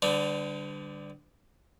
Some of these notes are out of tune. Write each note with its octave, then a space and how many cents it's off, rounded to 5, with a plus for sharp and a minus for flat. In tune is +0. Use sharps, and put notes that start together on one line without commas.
D3 +0 G3 +0 B3 +45